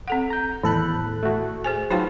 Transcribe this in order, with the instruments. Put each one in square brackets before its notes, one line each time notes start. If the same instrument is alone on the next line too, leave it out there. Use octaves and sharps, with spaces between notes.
[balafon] C4 A4 F#5
[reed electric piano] A#5 G6
[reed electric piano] E2 B5 [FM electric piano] A2 A4 F#6 [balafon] D#3
[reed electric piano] A3 F#4
[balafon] G#4 C5 G#5
[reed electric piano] F#3 F4 [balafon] D#4 C5 G5 [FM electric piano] B4 A5